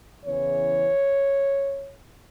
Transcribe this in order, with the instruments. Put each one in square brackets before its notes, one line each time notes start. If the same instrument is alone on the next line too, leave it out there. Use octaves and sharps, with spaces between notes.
[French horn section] E2 C#3 E3 C#5